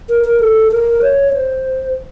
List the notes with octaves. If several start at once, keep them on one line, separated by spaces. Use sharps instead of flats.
A#4
A#4
A4
A#4
C#5
C5